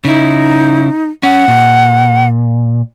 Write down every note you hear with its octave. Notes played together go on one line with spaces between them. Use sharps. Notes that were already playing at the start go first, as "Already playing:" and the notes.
C#3 D#4 E4
C#4 F#5
A#2